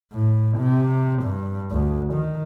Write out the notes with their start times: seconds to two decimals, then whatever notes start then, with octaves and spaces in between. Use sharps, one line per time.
0.13 A2
0.58 C3
1.23 G2
1.72 D2
2.14 D#3